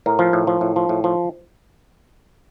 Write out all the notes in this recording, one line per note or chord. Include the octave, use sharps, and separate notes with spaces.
A2 A#4
F3
A2
F3
A2
F3
A2
F3